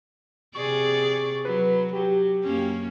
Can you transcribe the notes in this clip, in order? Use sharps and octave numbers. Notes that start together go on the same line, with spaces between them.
C3 G#4 D5 C#6
F#3 B4
F#3 G4
F#2 A#3 C#4